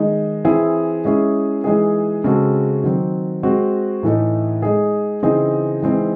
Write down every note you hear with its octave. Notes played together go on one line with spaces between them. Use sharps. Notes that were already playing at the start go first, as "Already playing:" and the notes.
Already playing: D#3 G#3 D#4
E3 C4 E4 G#4
G#3 C#4 E4 G#4
E3 G#3 D#4 G#4
C#3 G#3 C4 F#4 A4
D#3 F#3 C4
G#3 C4 F#4
A2 E3 A3 D#4
G#3 D#4 G#4
C#3 E3 C4 D#4 G#4
E3 G#3 C4 D#4